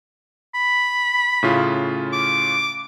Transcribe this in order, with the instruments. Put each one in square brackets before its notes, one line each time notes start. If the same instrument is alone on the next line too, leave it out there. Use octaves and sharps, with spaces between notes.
[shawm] B5
[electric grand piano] A2 C#3 F4
[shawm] D6